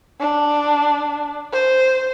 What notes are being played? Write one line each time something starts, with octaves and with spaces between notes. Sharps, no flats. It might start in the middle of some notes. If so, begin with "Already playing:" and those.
D4
C5